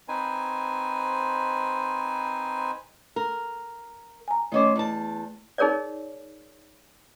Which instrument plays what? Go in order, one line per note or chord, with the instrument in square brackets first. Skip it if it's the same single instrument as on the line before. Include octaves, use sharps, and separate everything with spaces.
[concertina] C4 D#4 B4 C5 G#5
[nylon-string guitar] A#4
[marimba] G#5 A#5
[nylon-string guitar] D#3 C#4 C5 [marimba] A3 D#5 D6
[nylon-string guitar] E2 A5
[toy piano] D#4 G#4 A#4 C#5 D5